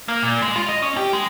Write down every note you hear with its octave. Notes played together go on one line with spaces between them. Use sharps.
A#3
A#2
G#3
F4
D#5
C#4
G4
G#3